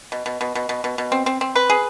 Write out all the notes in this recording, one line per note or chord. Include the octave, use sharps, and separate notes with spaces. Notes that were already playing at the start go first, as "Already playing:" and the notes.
B2
B2
B2
B2
B2
B2
B2
C4
C4
C4
B4
G#4